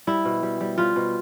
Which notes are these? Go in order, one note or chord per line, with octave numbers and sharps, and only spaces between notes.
G3 E4
B2
G3
G3
G3 F4
B2